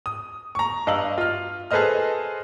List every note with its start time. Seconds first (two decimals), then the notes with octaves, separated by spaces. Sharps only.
0.06 D#6
0.55 A#5 C#6
0.87 G2 D#5 F5 E6 F#7
1.18 F4 F6
1.71 G#4 A4 B4 C5 D#5 F6